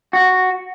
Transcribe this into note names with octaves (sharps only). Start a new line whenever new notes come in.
F#4